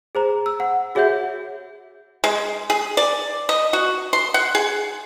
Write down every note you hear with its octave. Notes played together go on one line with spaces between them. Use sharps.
G#4 C5 A#5
E6
F#5
F#4 G#4 C#5 E5 F#5 G6
G#3
G#4
D5
D#5
F#4
C6
F#5
G#4